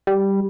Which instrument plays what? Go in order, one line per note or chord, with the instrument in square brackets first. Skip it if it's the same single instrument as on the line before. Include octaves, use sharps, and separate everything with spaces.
[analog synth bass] G3